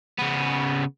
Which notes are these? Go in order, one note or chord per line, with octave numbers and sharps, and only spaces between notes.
C#3 B3